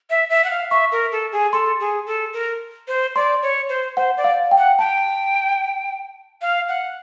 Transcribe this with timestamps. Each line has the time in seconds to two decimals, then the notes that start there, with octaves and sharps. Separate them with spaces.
0.10 E5
0.30 E5
0.44 F#5
0.50 F5
0.71 E5 C#6
0.92 A#4
1.12 A4
1.32 G#4
1.53 A4 C6
1.80 G#4
2.07 A4
2.33 A#4
2.88 C5
3.16 D5 C6
3.42 C#5
3.69 C5
3.96 C5 F#5
4.17 D5
4.24 F5
4.51 G5
4.58 F#5
4.79 G5 A5
6.42 F5
6.68 F#5